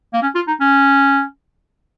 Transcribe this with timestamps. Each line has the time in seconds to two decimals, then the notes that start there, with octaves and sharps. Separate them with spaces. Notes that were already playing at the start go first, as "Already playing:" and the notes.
0.13 A#3
0.22 C#4
0.35 F4
0.48 D#4
0.60 C#4